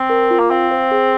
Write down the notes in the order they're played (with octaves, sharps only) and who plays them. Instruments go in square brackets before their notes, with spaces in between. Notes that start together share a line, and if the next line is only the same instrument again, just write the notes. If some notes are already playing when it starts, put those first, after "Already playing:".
Already playing: [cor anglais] C4
[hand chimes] A#4
F4
[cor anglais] A#3
[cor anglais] C4 [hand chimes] F5
[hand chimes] C5
G#4